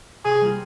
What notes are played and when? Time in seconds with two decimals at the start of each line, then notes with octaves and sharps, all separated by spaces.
0.25 C3 G#4
0.41 G3 A#3 F4